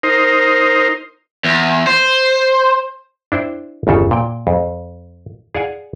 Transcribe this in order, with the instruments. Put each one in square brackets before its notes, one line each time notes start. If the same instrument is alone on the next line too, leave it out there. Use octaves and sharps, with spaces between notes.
[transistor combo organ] D#4 A#4 C5
[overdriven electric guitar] E2
C5
[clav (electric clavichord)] D4 E4 C5 G5
G1 E2 C#3 A4
A#2 G5
F2
G#4 D5 F5 F#5 G#5